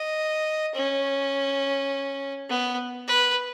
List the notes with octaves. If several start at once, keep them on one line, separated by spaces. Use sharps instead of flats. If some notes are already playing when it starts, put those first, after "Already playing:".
Already playing: D#5
C#4
B3
B4